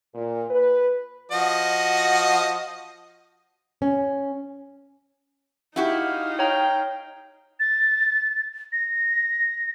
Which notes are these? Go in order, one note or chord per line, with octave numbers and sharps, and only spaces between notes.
A#2
B4
F3 F#4 D#5
C#4
D#4 E4 F#4 G4 F5
C#5 G5 A#5
A6
A#6